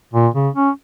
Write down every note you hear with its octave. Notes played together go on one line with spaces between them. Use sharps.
A#2
C#3
C#4